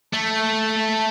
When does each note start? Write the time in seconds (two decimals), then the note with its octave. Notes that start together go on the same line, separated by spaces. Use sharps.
0.13 A3 A5